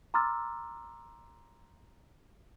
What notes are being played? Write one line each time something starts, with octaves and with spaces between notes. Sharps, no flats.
A#5 C6 D6 E6 F6 A6